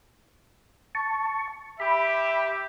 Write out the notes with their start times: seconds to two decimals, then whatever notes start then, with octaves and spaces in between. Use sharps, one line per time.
0.95 A5 C#6
1.80 G4 E5 B5